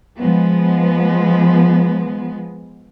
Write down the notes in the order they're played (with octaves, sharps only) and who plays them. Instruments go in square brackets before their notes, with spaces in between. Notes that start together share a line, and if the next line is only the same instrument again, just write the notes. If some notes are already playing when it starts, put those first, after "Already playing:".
[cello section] F3 G#3 B3